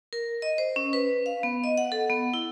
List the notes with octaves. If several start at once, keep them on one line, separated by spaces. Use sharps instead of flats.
A#4
D#5
C5
C#4
B4
F5
B3
D#5
F#5
A4
B3
E4